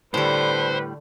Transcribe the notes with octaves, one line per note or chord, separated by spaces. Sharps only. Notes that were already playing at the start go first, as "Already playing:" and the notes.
A2 D3 G3 B4 C5